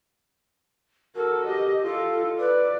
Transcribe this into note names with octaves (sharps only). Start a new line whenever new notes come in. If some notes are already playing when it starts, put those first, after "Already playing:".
F#4 A4 A#4
G4 D#5
F4 A4
B4 D5